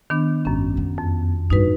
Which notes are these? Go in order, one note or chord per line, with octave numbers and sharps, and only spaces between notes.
D#3 B3 D4
G#1 F#2 C#4
B3
F2
A1 G2 D#4 F#4 B4